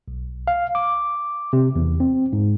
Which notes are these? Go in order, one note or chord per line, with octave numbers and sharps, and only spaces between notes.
B1
F5
D6
C3
E2
C4
G#2